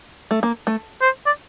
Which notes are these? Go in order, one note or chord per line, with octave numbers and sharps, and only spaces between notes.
A3
A#3
A3
C5
D5